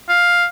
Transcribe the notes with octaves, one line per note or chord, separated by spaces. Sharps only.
F5